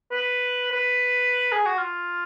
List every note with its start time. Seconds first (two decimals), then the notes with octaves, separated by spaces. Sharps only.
0.11 B4
0.72 B4
1.52 G#4
1.65 F#4
1.78 F4